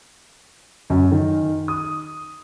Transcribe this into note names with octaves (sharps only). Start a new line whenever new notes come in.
F#2
D#3
D#6